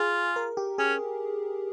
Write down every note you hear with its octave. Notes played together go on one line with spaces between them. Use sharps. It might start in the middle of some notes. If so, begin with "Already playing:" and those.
Already playing: F4 G#4
A#4
G4
C#4 G#4